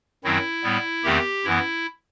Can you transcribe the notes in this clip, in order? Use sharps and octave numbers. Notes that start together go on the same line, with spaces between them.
F#2 D#3 F#3 C4 E4
A2 G3 B3
E2 D#3 A3 C4 G4
F#2 E3 B3 E4